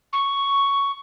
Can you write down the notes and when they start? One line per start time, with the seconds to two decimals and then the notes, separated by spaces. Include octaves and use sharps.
0.13 C#6